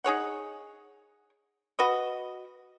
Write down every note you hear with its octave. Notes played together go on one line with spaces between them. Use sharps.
D#4 G#4 C#5 F#5
F#4 B4 D#5